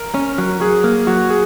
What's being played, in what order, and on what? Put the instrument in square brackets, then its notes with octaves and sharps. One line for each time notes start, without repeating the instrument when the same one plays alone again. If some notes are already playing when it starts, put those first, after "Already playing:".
Already playing: [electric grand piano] A#4
[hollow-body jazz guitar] C#4
F#3
[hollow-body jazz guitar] F#3 [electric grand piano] G#4
[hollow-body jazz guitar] A#3
[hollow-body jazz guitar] F#3 [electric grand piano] F#4
[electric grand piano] G#4